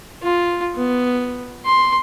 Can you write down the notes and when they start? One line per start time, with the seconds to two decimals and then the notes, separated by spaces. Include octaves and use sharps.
0.23 F4
0.75 B3
1.65 C6